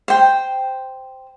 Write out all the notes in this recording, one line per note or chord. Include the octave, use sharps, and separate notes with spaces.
C5 G5